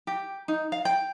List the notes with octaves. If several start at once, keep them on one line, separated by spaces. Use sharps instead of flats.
G4
D#4
F5
G5